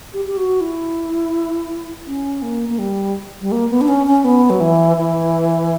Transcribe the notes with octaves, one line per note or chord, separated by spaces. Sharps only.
G4
G4
F#4
E4
C#4
A#3
A#3
G3
G3
A#3
B3
D4
C#4
C#4
B3
F#3
E3
E3